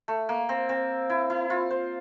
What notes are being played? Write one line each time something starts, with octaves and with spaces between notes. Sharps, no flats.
A3
A#3
C4
C4
E4
E4
F4
C5